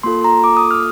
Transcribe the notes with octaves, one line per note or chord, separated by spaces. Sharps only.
A#3 F4 A4 C6
A#5
D6
D#6
F6